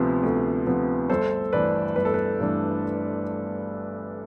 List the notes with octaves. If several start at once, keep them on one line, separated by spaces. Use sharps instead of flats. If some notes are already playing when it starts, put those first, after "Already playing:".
Already playing: D2 C3 F3 B3
D2
C3 F3 B3
G1 A4 C5
G2 E3 A3 D4 B4 D5
G1 B4
A4
B4
G2 E3 A3 D4